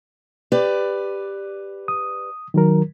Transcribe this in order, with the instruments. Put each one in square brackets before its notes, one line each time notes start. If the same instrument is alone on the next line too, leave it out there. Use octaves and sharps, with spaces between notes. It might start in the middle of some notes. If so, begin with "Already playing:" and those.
[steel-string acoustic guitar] G4 B4 D5
[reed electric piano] D#6
D#3 F#3 A#4